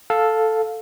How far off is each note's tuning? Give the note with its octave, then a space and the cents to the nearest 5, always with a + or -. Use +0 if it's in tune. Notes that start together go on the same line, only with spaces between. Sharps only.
A4 +0 F5 +10